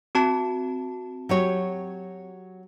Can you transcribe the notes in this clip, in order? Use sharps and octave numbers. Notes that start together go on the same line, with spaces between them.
C4 F#4 A5
F#3 G4 C#5